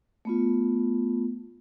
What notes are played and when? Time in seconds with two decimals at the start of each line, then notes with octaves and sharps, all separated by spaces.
0.25 A3 B3 F4